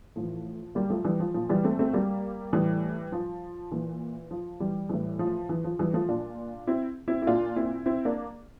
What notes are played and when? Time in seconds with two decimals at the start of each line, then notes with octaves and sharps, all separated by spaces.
0.16 A2 E3 F3
0.75 G3 A#3
0.90 F3 A3
1.05 E3 G3
1.20 F3
1.34 A#2 F3
1.49 E3 G3
1.64 A3 C4
1.79 A3 C4
1.93 G3 A#3
2.53 A2 E3 G3
3.12 F3
3.71 A#2 E3
4.31 F3
4.60 E3 G3
4.89 A2 E3 G3
5.19 F3
5.49 E3
5.64 F3
5.79 E3 G3
5.93 F3 A3
6.08 A#2 D4 F4
6.67 C4 E4
7.08 C4 E4
7.22 E4
7.27 A#2 D4 F4
7.56 C4 E4
7.86 C4 E4
8.05 A#3 D4